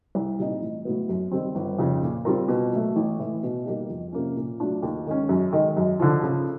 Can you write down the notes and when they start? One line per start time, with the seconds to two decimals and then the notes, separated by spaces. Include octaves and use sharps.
0.15 C2
0.39 A#2 G3 C4 D#4
0.61 A1
0.85 A2 F#3 B3
1.09 F#2
1.32 D#3 G3 C4
1.55 G1
1.78 F2 C#3
2.03 A#2
2.25 G3 C4 F4 A#4
2.48 B2
2.73 F#3 A3
2.96 A1
3.19 A2 E3
3.43 B2
3.66 G3 A#3 D#4 G4
3.89 F2
4.13 C3 F3 A#3 C#4
4.37 A#2
4.60 F#3 A3 D4 F4
4.82 D#2
5.07 D#3 G#3 C#4
5.29 F#2
5.53 D#3 G#3
5.77 F#2
6.00 D3 F3
6.23 C#3